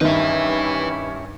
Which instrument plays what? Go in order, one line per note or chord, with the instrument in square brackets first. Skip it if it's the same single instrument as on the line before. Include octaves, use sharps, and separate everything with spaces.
[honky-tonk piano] G2 D#3 [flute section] C#4 E4 G4 [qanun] D#4 [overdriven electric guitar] B4 E5